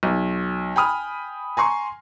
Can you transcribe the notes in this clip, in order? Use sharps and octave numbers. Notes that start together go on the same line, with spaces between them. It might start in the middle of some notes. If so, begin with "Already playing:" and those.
B1
G5 G#5 B5 D#6 F6
G#5 A#5 C6 C#6